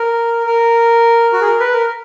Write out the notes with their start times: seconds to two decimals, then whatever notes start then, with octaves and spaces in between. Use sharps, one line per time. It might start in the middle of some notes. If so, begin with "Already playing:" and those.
Already playing: A#4
0.46 A#4
1.33 F#4
1.40 G#4
1.47 A#4
1.60 B4
1.73 A#4